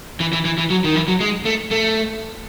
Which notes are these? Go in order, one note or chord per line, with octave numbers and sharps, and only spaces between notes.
E3
E3
E3
E3
F#3
D#3
E3
F#3
G#3
A3
A3